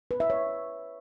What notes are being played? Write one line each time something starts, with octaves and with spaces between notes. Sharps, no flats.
B4
E5
C#5